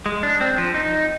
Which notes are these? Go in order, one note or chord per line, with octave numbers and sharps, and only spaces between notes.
G#3
D4
C4
F3
D#4